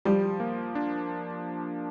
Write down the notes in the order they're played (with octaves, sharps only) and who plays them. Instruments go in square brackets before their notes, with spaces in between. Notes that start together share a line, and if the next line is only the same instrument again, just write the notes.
[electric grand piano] F3 [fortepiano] G3
[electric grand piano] A#3
D4